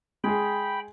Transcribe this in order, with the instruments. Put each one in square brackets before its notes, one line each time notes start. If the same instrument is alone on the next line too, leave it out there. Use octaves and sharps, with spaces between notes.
[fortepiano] G#3 G#4 [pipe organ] G5 B5